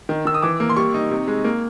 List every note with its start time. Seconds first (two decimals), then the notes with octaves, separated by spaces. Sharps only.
0.09 D#3
0.25 D#3 E6
0.34 D#6
0.42 E3 D6
0.60 A#3
0.70 C6
0.76 G3 C#6
0.94 D#4
1.11 C3
1.27 G#3
1.44 A#3